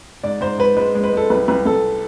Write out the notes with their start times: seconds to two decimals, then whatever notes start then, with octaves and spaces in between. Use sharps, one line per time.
0.23 G#2 D5
0.41 G#2 C5
0.58 G#2 B4
0.77 G#3 B4
0.95 G#3
1.04 B4
1.13 G#3 A4
1.30 C2 B4
1.48 C2 B4
1.66 C2 A4